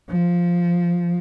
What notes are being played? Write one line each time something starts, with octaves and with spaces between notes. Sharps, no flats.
F3